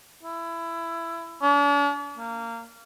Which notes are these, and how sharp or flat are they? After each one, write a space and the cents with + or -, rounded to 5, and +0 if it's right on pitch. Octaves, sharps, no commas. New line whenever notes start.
E4 +20
D4 -45
A#3 -20